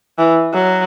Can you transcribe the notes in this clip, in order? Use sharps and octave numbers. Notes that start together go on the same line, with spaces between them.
E3
F#3